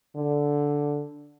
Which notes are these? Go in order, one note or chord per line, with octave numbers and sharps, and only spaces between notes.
D3